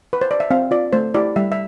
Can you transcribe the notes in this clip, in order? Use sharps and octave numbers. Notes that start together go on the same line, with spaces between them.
B4
C5
D5
E5
C4 F5
F4 D5
A3 C5
E4 G4 D5
G3 E5
E5